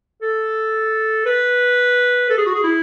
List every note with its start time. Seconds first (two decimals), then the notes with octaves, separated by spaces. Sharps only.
0.22 A4
1.26 B4
2.29 A4
2.38 G#4
2.46 F#4
2.55 G#4
2.64 E4